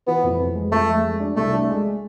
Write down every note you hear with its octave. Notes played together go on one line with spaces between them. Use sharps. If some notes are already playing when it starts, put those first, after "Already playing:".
E3 B3
F2
F2
G#3
F2 A3
G#3
G#3
D4
C2 A3
D4
G#3